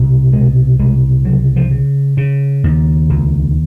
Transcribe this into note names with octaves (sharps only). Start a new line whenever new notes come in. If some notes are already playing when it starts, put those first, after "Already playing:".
Already playing: C2 B2
B2 G#3
C2 G#3
C#3 F#3
F3
C#3
C#3
D#2
C#2